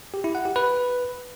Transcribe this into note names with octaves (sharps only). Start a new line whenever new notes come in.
G4
E4
F#5
G4
B4